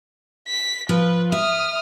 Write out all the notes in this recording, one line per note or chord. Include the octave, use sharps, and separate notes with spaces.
B6
F3 F4 B4
E5 D#6 F6